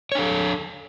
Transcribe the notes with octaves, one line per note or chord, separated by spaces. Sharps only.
D4 A4 C#5